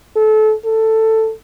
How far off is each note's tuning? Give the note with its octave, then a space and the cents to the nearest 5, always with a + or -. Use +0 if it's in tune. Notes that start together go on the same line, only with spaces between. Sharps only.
A4 -25
A4 +10